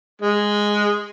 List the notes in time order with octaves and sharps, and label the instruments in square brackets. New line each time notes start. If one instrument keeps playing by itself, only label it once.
[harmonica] G#3